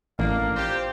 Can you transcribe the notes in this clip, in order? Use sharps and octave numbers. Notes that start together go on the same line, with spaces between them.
A1 A#3 D4 F5
C4 F4 G4 C5